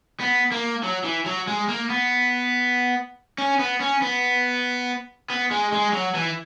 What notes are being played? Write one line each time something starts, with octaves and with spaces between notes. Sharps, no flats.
B3
A#3
F#3
E3
F#3
G#3
A#3
B3
C#4
B3
C#4
B3
B3
G#3
G#3
F#3
E3